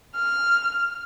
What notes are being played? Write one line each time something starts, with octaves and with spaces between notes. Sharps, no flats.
F6